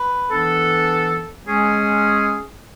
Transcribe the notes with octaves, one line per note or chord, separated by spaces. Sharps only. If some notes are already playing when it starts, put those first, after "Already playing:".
Already playing: B4
E3 B3 D4 A4
G#3 C#4 G#4